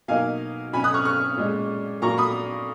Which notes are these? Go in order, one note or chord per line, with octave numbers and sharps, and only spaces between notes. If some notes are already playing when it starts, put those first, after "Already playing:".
B2 F#3 A#3 D#4 F5 G#5
B2 F#3 C#4 G#5 B5
D#6 F#6
C#6 F6
C#6 F6
A#2 G#3 C#4
A#2 F#3 A#3 A#5 C#6
B5 D#6